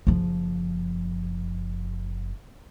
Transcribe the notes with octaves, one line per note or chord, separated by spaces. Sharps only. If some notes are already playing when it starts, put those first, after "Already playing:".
F#1 F3